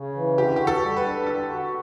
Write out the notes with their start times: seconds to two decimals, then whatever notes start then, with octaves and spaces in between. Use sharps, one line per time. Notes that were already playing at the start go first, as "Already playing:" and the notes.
Already playing: C#3
0.16 E3
0.37 D3 G4
0.56 F#4 G4
0.67 A4
0.82 G3
0.97 B4
1.04 D4
1.27 D3 A4
1.49 F#4